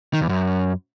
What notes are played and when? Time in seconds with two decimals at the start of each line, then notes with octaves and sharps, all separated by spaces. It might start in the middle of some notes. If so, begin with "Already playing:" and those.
0.14 D#3
0.21 E2
0.29 F#2